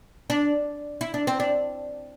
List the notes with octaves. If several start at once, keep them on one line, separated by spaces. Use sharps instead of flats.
D4
E4
D4
C4
D4